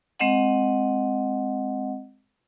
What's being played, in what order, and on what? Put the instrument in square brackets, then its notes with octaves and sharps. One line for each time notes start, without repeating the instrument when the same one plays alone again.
[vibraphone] G#3 C4 D#5 F#5